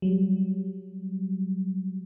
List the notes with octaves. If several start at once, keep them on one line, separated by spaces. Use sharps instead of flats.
F#3 G3